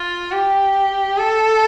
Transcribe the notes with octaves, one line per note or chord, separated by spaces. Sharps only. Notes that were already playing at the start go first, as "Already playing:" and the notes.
Already playing: F4
G4
A4